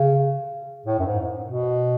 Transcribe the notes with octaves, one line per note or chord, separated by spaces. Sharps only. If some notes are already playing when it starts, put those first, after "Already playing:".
Already playing: C#3
A2
F#2
G#2
B2